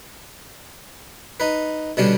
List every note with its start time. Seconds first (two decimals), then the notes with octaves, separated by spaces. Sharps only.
1.40 D#4 B4
1.97 B2 D3 G3 C#4 D4